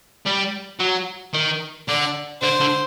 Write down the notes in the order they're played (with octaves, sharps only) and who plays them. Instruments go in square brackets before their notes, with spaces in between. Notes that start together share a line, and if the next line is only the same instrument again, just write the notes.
[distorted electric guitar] G3
F#3
D#3
[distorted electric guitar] D3 [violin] D5
[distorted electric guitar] D3 [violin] C5
[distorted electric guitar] D3